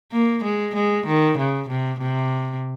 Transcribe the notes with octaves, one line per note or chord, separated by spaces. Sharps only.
A#3
G#3
G#3
D#3
C#3
C3
C3